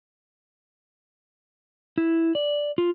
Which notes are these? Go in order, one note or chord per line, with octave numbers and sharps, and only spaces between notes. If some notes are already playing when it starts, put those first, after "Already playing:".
E4
D5
F4